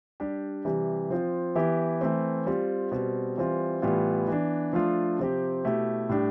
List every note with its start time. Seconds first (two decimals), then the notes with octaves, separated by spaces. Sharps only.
0.20 G3 D4 G4
0.65 C3 E3 G3
1.10 F3 C4 F4
1.55 E3 B3 E4 G4
2.01 E3 A3 C4
2.46 G3 C4 F4
2.92 B2 G3 C4
3.37 E3 G3 C4 F4
3.82 A2 E3 G3 B3 F4
4.28 E3 B3 D4
4.73 F3 A3 D4 F4
5.19 C3 F3 C4 G4
5.64 B2 A3 E4 G4
6.09 A2 G3 D4 G4